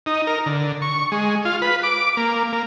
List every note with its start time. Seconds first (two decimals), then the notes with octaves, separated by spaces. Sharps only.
0.06 D#4
0.27 A#4
0.46 D3
0.82 C#6
1.12 G#3
1.45 F4
1.62 B4
1.83 D6
2.17 A#3
2.53 A#3